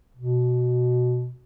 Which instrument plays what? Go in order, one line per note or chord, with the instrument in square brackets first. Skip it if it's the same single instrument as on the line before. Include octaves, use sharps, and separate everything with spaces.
[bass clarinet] B2